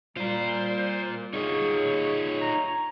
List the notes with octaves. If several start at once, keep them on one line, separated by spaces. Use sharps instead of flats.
G3 F4 A#4 C5
D#4 F4 G#4 C#5
A#5